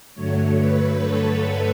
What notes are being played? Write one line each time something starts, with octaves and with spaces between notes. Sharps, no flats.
G2 D3 F#3 A3 C#5
B4
A4
B4